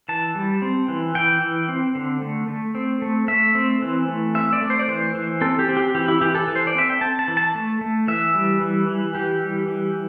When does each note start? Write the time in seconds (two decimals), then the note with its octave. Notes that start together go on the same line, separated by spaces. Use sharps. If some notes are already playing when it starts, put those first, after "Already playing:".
0.09 E3 A5
0.35 G3
0.62 C4
0.88 E3
1.15 E3 G5
1.42 E3
1.68 C4
1.95 D3
2.22 A3
2.48 A3
2.75 C4
3.02 A3
3.28 A3 E5
3.55 C4
3.82 E3
4.08 A3
4.35 C4 E5
4.53 D5
4.61 A3
4.70 C5
4.79 D5
4.88 E3 C5
5.15 E3
5.41 C4 A4
5.59 G4
5.68 C4
5.77 G4
5.95 E3 G4
6.08 E4
6.21 E3 G4
6.35 A4
6.48 E3
6.56 C5
6.67 D5
6.75 C4 E5
6.90 G5
7.01 C4 A5
7.19 A5
7.28 E3
7.37 A5
7.55 A3
7.81 A3
8.08 E3 E5
8.35 G3
8.61 E3
8.88 E3
9.15 E3 G4
9.41 G3
9.68 E3